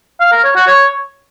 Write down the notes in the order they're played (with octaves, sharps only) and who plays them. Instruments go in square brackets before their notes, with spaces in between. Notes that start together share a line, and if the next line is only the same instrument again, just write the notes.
[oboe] F5
A#4
C#5
F#4
C#5